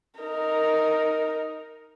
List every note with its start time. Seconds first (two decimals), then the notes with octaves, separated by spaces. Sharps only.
0.20 D#4 A#4